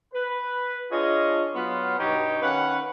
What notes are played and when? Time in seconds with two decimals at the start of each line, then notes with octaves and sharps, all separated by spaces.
0.14 B4
0.92 D4 F4 G#4 C#5 D#5
1.55 F#3 B3 F4
1.99 G2 B2 D#4 G4 C#5 G5
2.41 D#3 C#4 B4 F5 F#5